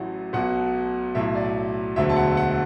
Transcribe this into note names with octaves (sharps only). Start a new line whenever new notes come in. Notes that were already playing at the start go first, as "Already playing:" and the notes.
Already playing: A1 A2 F#3 F#5
B1 B2 F#3 F#5
B1 A2 F#3 E5
D5
E1 D2 D3 F#3 E5
A5
F#5
F#5